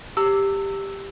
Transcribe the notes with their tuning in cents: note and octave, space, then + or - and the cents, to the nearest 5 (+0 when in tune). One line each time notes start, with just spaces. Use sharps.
G4 +5 A#5 -45 E6 +0